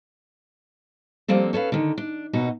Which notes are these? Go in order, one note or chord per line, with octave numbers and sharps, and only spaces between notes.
F3 G3 A#3 C4 A4
C#4 A4 B4 F5
D3 D#3
D4
D#2 B2 D#4 F#4